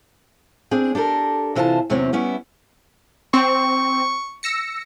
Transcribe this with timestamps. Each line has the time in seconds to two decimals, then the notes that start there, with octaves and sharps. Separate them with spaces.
0.71 C4 D4 G#4
0.95 D4 G4 A4 A#4
1.55 C3 E3 F4 C5 E5 A5
1.90 E2 C3 F#3 C4 C#4 C#5
2.13 G3 B3 C#4 E4
3.34 C4 C#6
4.43 E6 A#6 C#7